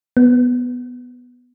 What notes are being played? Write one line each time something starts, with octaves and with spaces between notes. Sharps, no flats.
B3